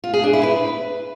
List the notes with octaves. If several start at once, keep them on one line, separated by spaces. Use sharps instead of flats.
F4
G#4
D4
E4
B4